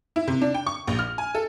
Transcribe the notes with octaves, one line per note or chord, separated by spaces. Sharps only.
E4
C3
D4
G5
C#6
A#1
F6
G#5
A4